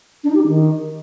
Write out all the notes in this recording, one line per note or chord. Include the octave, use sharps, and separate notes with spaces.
D4
D#4
G4
D#4
D#3